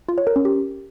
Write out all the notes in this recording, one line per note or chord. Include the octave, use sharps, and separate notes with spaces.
F4
C#5
A#4
C#4
G4